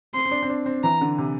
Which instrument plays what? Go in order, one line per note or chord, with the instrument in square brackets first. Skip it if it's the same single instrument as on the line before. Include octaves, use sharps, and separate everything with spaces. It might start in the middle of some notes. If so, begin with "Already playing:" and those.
[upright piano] C4 [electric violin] C6
[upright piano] C4
D4
C4
D4
C4
[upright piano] E3 [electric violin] A#5
[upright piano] D3
C3